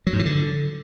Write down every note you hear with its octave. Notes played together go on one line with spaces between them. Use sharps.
F#3
G#2
E3
D3